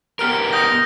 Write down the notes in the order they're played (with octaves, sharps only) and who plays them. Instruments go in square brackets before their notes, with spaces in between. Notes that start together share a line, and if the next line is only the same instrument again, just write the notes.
[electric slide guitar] B3 G4 A#4 [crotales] F6 D7
[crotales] D#6 G6 A#6